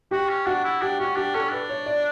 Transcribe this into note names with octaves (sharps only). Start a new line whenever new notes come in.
F#4 G4
C#4
D4 F#4
E4
D4 G4
C#4 F#4
D4 G4
C#4 A4
D4 B4
C#5
D5